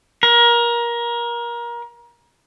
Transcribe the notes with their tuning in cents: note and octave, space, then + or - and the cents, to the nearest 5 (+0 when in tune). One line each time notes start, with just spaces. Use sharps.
A#4 +25